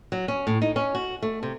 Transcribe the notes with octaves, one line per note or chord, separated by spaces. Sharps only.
F#3
C#4
A2
D#4
C#4
F#4
A3
C3